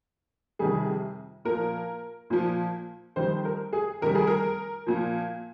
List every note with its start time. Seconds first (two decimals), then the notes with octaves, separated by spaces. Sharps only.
0.59 F2 C3 D#3 G3 G#4
1.45 A#2 F3 A#4
2.30 A#2 F3
3.16 F2 D#3 G3 C5
3.45 A#4
3.73 G#4
4.02 F2 D#3 G3 A#4
4.15 G#4
4.27 A#4
4.87 A#2 F3